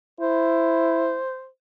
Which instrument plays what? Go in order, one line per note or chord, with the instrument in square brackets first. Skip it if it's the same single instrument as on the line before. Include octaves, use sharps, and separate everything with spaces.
[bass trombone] E4 [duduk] C5